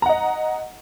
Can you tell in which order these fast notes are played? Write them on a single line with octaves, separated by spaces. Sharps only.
A#5 F#5 D#5